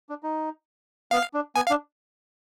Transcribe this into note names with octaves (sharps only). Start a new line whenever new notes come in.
D4
D#4
B3 F5
D4
B3 G#5
F5
D4